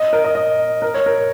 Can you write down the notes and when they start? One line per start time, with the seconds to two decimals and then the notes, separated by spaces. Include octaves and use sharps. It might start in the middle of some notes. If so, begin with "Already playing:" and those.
Already playing: D#5
0.13 A#4
0.24 D#5
0.35 D#5
0.82 A#4
0.94 C#5
1.06 A#4